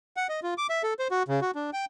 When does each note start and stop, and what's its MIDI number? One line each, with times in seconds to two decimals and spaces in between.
0.17 0.27 78
0.29 0.40 75
0.43 0.54 65
0.58 0.67 86
0.70 0.82 76
0.83 0.94 69
0.99 1.08 72
1.11 1.23 66
1.28 1.40 49
1.42 1.51 66
1.55 1.70 62
1.73 1.85 79